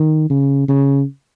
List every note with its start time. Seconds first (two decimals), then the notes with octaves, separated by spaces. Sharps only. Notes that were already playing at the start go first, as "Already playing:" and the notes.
Already playing: D#3
0.30 C#3
0.68 C#3